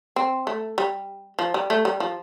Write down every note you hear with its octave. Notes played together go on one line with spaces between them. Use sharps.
C4
A3
G3
F3
G3
A3
G3
F3